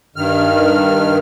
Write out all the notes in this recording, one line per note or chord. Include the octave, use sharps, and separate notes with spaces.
G2 D#3 F6